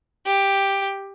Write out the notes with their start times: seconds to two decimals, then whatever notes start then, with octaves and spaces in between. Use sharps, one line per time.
0.27 G4